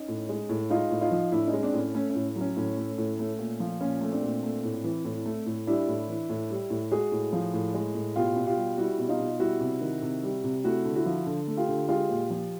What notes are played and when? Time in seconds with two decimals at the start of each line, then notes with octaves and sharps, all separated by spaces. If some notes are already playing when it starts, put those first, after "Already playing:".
Already playing: C#4 D#4
0.08 A2
0.29 G#3
0.49 A2
0.70 G#3 D#4 F4
0.91 A2
1.01 D#4 F4
1.11 F3
1.32 A2 D4 E4
1.48 C#4 D#4
1.53 G#3
1.63 C4 D4
1.73 A2
1.79 C#4
1.94 A3 C#4
2.10 C#4
2.15 A2
2.36 F#3
2.41 C#4
2.56 A2 C#4
2.77 A3
2.98 A2
3.19 A3
3.39 A#2
3.60 F3
3.81 A#2 C#4
4.01 A3
4.12 C4 D4
4.23 A#2
4.43 A3
4.64 A2
4.84 E3
5.05 A2
5.26 A3
5.46 A2
5.67 G3 D4 E4
5.88 A2
6.09 E3
6.30 A2
6.50 G3
6.70 A2
6.91 G#3 F#4 G#4
7.12 A2
7.33 F3
7.54 A2
7.74 G#3
7.95 A2
8.16 B2 F4 G4
8.36 B2
8.47 F4 G4
8.57 G3
8.78 G3 E4 F#4
8.98 B2
9.09 D#4 F4
9.20 B2
9.40 G3 E4 F#4
9.60 C3
9.81 D#3
10.02 C3
10.23 G3
10.44 C3
10.64 A3 E4 F#4
10.85 D3
10.95 E4 F#4
11.06 F3
11.26 D3
11.47 A3
11.57 F4 G4
11.68 D3
11.89 G#3 F4 G4
12.09 A#2
12.30 F3